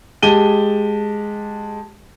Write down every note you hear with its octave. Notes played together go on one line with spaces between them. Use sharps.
G#3 G4 A5 D#7 G7